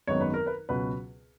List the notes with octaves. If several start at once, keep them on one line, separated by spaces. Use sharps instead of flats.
G#1 F#2 D#3 G#3 B3 C#5
B4
A#4
B4
C#2 B2 F#3 B4